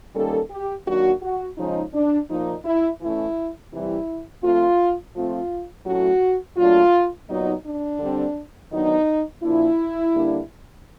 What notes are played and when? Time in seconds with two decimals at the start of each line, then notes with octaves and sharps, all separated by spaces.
0.14 D#3 G3 A#3 C#4 A4
0.50 G4
0.86 D#3 F#3 A#3 D4 F#4
1.22 F#4
1.57 C#3 F3 G#3 C#4 D#4
1.93 D4
2.29 A#2 F3 A#3 D#4
2.64 E4
3.00 E3 A3 C#4 E4
3.72 C3 E3 G3 E4
4.42 F3 A3 C4 F4
5.14 F3 A3 C4 F4
5.86 A2 F#3 A3 C#4 F#4
6.56 A#2 F#3 A3 D4 F4
7.28 A#2 F#3 B3 D#4
7.65 D4
7.99 D3 G3 C4
8.71 D#3 F#3 B3 D4 D#4
9.43 A#2 F3 A#3 D4 E4
10.14 D3 G3 A#3 D4